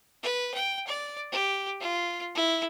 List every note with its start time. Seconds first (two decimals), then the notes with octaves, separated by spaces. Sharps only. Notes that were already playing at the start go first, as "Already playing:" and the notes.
0.23 B4
0.54 G5
0.87 D5
1.32 G4
1.80 F4
2.35 E4